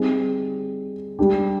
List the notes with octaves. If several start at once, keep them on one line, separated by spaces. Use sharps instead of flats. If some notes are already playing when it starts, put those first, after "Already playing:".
Already playing: G3 C4 D#4 G#4
G3 D4 G4